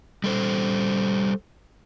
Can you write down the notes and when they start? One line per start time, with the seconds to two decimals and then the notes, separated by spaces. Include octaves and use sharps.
0.24 G3 A4 C5